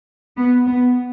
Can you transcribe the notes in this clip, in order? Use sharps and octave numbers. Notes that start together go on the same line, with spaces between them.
B3
B3